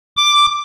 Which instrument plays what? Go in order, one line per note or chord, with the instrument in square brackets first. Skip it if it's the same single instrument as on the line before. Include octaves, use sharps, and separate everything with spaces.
[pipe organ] D6